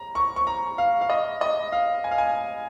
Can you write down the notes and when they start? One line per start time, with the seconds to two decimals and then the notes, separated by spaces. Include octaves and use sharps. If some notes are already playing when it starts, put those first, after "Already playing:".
Already playing: A#5
0.15 C#6
0.36 C#6
0.47 A#5
0.78 F5
1.01 F5
1.10 D#5
1.41 D#5
1.72 F5
2.04 G#5
2.11 F5
2.18 G#5